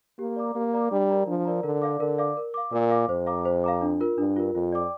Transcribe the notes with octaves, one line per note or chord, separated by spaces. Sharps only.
A#3 G4
D5 A#5 D6
A#3 G4
D5 A#5 D6
G3 D4
A#4 D5 A#5
F3 D4
A#4 D5 A#5
D3 A#4
D5 F5 D6
D3 A#4
D5 F5 D6
A#4
F5 D6
A#2 A#4
F5 D6
F2 C5
F5 A#5 D6
C5
F5 A#5 D6
D4
F4 A#4
G2 D4
F4 A#4
F2 F4
D5 G5 D6